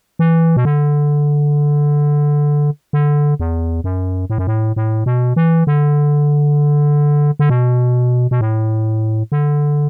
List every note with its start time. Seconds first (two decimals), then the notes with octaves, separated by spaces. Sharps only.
0.19 E3
0.57 B2
0.65 D3
2.93 D3
3.40 E2
3.84 F#2
4.30 A2
4.38 F#2
4.47 A2
4.76 A2
5.06 B2
5.36 E3
5.67 D3
7.39 D3
7.49 B2
8.31 B2
8.41 A2
9.32 D3